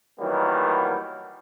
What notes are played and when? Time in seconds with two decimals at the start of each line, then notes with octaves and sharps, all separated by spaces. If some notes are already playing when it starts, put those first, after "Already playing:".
0.20 D#3 E3 F#3 G3 A#3 B3